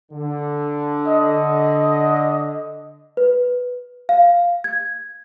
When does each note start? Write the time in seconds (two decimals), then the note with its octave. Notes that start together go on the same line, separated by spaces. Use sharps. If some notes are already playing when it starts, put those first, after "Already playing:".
0.11 D3
1.08 D#5
3.17 B4
4.09 F5
4.64 G#6